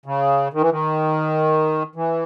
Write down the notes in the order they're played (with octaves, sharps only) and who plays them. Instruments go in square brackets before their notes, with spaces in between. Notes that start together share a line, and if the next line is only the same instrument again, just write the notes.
[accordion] C#3
D#3
E3
D#3
E3